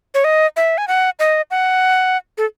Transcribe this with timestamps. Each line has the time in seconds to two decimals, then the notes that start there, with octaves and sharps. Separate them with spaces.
0.14 C#5
0.24 D#5
0.57 E5
0.78 G#5
0.88 F#5
1.19 D#5
1.51 F#5
2.38 A4